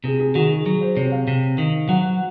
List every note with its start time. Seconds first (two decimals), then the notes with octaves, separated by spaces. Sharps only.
0.04 C3 G#4
0.20 G#4
0.35 D#3 F#4
0.50 G#4
0.66 F#3
0.81 C5
0.97 C3 C#5
1.12 F5
1.28 C3
1.58 D#3
1.89 F#3 F#5